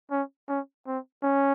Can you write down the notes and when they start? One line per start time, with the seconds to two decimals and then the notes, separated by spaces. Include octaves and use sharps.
0.11 C#4
0.48 C#4
0.87 C4
1.23 C#4